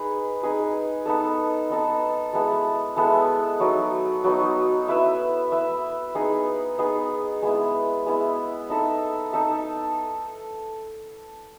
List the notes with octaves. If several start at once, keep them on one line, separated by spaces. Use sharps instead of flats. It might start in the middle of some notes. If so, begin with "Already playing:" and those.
Already playing: D#4 G#4 B4
D#4 G#4 B4
B3 D#4 A4
B3 D#4 A4
G#3 B3 E4 A4
G#3 B3 E4 A4
F#3 B3 D#4
F#3 B3 D#4
E4 B4 E5
E4 B4 E5
B3 D#4 G#4
B3 D#4 G#4
G#3 B3 E4
G#3 B3 E4
D#4 A4 E5
D#4 A4 E5